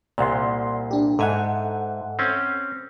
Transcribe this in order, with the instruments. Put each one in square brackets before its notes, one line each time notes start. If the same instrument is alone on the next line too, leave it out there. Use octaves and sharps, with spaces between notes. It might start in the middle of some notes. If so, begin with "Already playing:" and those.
[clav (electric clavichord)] C2 A#2 [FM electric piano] D5 F#5 C6
[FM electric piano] D4 G4
[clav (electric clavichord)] G#2 G#5 [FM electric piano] A4 E5 F#5
[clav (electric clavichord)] C4 C#4